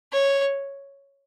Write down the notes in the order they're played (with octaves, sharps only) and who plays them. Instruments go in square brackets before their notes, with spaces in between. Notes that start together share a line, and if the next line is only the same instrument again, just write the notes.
[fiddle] C#5